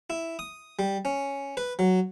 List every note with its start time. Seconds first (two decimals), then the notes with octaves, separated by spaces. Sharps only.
0.10 E4
0.39 D#6
0.79 G3
1.05 C#4
1.57 B4
1.79 F#3